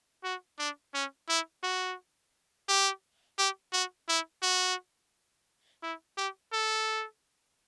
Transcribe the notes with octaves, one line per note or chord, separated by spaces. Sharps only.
F#4
D4
C#4
E4
F#4
G4
G4
F#4
E4
F#4
E4
G4
A4